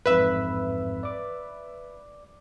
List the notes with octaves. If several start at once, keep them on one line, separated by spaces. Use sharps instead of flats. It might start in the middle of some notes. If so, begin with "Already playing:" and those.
A1 F2 G#2 B4 E5
D5 D6